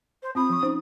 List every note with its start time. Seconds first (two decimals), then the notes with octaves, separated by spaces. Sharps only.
0.22 C5
0.35 C4 F4 B5 D#6
0.50 F3 C#6
0.63 C#4 D#4 C5